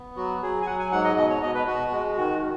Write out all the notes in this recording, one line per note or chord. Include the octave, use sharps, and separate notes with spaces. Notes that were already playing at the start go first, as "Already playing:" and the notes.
Already playing: B3
F#3 F#4
F#3 G#4
G#5
F#3 F#5
G#5
G#2 F#5
D#5
B2 D#5
C#5
B2 D#5
B4
B2 F#4
G#3
D#3 F#4